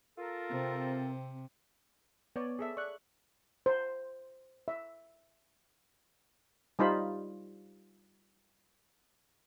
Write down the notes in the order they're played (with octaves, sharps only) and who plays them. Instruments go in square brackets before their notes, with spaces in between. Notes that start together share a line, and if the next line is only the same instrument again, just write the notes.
[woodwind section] F4 A4 A#4
[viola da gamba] C3 [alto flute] C4
[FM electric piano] B3 [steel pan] C#5 D5
[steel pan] G#4 A4 E5
[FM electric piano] D5 F#6 [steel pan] C#6
[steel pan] C5
E5
G3 D#4 F4 C5 B5